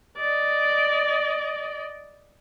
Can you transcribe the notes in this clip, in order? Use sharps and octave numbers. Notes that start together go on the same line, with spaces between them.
D5 D#5